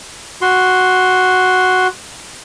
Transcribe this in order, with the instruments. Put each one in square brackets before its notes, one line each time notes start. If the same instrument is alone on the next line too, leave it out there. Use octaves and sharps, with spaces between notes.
[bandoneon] F#4 C6